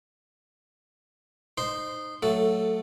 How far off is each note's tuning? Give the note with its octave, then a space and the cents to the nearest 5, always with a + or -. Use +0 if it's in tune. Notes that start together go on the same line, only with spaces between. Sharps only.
D#4 -15 C5 +0 C6 -10
F#3 +0 A3 +15 A4 +0